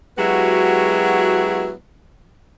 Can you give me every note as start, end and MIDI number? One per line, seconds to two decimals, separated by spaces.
0.18 1.73 54
0.18 1.73 56
0.18 1.73 59
0.18 1.73 64
0.18 1.73 66
0.18 1.73 67